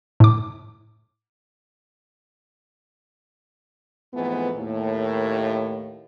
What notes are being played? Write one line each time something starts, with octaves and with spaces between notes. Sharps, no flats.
A2 D6
F2 G#2 E3 A3 B3
D#2 A2